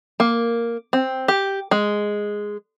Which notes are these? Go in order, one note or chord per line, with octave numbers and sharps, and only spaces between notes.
A#3
C4
G4
G#3